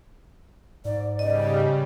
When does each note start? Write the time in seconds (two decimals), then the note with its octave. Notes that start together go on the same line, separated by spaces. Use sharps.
0.85 G#2 D5
1.19 C#3 G3 D5 D#5